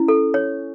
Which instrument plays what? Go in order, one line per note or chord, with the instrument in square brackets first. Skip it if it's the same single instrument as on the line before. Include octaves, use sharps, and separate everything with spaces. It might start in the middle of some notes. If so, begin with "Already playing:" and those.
Already playing: [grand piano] C#4 [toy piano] E4
[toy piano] A4
C#5